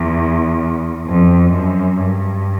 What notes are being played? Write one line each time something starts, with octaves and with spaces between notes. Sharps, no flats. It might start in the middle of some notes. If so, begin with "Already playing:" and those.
Already playing: E2
F2
F#2
G2